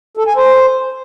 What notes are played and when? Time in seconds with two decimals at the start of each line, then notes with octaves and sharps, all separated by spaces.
0.17 A4
0.27 G#5
0.36 C5